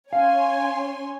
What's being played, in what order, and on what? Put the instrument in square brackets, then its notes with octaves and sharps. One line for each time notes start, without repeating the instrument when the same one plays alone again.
[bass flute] C#4 [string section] C#5 G#5 C6 [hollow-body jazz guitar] F5